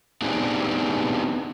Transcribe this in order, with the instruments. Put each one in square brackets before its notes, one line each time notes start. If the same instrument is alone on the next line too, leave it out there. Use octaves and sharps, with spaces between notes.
[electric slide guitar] B3 C4 D4 D#4 G4 G#4